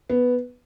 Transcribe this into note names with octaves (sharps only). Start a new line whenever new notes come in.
B3